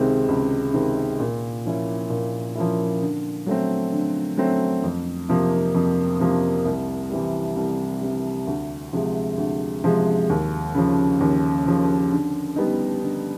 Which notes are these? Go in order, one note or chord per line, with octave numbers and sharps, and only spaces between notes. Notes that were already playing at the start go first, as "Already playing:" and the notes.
Already playing: C#2 C3 D#3 G#3 C4
C#2
C3 D#3 G#3 C4
A#2
F3 A#3 C#4 E4
A#2
F3 A#3 C#4 E4
D3
F#3 A3 C4
D3
F#3 A3 C4
F2
C3 F3 A#3
F2
C3 F3 A#3
C2
C3 E3 G3
C2
C3 E3 G3
D2
C3 F3 G#3
D2
C3 F3 G#3
D#2
C#3 F3
D#2
C#3 F3
D3
G3 B3 D#4
D3